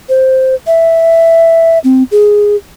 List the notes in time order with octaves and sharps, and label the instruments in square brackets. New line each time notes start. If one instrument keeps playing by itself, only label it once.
[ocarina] C5
E5
C4
G#4